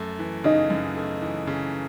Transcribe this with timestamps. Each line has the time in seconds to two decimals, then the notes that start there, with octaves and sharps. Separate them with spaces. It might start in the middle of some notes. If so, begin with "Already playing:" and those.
Already playing: F#2 A3
0.19 E3
0.44 C#3 D#4
0.70 F#2
0.97 A3
1.22 E3
1.47 C#3